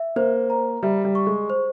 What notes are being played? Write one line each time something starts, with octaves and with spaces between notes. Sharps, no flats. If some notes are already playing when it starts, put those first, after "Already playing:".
Already playing: E5
A#3 C5
A#5
G3 E5
G3
C#6
G#3
C5